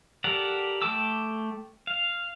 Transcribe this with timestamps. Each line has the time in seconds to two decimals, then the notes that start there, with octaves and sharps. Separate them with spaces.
0.24 G4 A4 A#4 D5 F#5
0.82 A3 G5 A5 D6 E6
1.87 F5